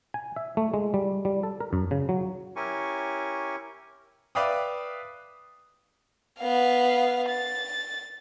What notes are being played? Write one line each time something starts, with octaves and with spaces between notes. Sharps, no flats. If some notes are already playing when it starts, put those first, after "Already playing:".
G#5
E5
A3
G#3
G3
G3
A4
A#4
F#2
C#3
F#3
C#4 E4 G4 A#4 G#5 C#6
B4 D5 E5 F5 G5 D#6
B3 F5
A6